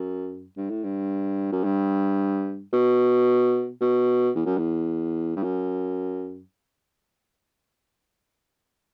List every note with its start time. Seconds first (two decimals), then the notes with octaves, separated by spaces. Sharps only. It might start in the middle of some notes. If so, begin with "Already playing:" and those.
Already playing: F#2
0.57 G2
0.70 A2
0.84 G2
1.52 F#2
1.64 G2
2.73 B2
3.81 B2
4.35 E2
4.46 F#2
4.58 E2
5.36 G2
5.43 F#2